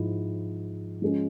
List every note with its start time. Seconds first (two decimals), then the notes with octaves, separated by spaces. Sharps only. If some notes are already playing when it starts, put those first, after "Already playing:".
Already playing: G#2 F3 G#3 E4
1.02 F3 G#3 C#4